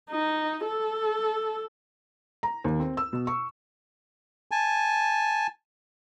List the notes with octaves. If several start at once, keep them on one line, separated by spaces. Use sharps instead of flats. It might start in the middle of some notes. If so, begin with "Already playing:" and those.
D#4
A4
A#5
D#2
C4
E6
B2
C#6
G#5 A5